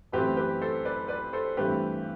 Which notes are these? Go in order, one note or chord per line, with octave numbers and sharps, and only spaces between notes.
F#2 E3 A3 C4 G4 B4
G4 B4
A4 C5
B4 D5
B4 D5
A4 C5
G2 E3 A3 C4 G4 B4